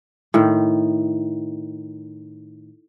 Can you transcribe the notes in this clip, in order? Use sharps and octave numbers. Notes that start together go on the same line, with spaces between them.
A2 D#3